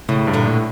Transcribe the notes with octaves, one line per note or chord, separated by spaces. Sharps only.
A2 C#3
G2
A#2 D3
A2